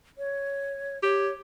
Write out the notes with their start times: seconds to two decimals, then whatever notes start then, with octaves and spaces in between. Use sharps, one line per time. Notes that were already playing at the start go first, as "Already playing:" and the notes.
0.18 C#5
1.03 G4 C#5